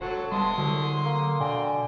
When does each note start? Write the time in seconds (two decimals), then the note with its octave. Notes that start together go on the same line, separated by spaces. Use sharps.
0.01 E1 F#3 F#4 A4 C5
0.32 B2 G3 E5 A5 C6 D#6
0.58 C2 D3 F#3
1.05 A#3
1.40 B2 D3 G5 G#5